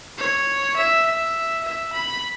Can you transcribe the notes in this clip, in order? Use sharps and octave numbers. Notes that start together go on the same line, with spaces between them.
C#5
E5
E5
E5
B5